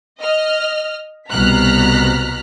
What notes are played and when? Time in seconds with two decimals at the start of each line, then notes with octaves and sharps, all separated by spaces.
0.20 D#5 F6
1.32 C2 B2 A#5 F6 F#6 B6